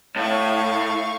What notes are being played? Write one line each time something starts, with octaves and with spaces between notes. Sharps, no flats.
A2 F5 C#6